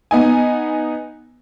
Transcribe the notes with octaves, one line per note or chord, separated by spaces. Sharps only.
B3 D#4 G#5